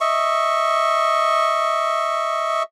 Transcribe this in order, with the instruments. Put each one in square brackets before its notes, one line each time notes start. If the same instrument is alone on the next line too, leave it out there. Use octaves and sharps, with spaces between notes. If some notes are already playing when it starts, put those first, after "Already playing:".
[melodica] D#5 E5 C#6